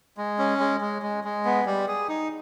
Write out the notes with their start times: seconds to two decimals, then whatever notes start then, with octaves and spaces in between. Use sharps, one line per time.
0.17 G#3
0.39 C#4
0.60 G#3
0.81 G#3
1.02 G#3
1.24 G#3
1.45 B3
1.66 G3
1.88 G#4
2.09 D#4